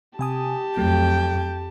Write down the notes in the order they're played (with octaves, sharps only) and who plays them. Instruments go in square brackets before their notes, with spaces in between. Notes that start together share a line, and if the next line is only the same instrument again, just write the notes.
[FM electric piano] C3 G#5 D#6 [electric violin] G4 A5
[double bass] F2 [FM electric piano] F#3 A3 [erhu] G5